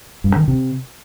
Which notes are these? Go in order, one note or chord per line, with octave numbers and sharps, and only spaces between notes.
G2
D#3
C3